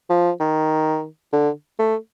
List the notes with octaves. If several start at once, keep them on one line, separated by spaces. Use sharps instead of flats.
F3
D#3
D3
A3